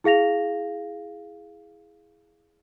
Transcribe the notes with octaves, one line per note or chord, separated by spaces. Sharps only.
E4 G#4 F5 A#6 F7